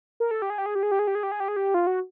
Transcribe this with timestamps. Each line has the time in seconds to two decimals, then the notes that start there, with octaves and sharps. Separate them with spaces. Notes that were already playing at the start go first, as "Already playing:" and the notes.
0.20 A#4
0.31 A4
0.42 G4
0.50 G#4
0.58 G4
0.66 G#4
0.75 G4
0.83 G#4
0.91 G4
0.99 G#4
1.07 G4
1.15 G#4
1.23 G4
1.32 G#4
1.40 G4
1.48 G#4
1.56 G4
1.74 F4
1.87 F#4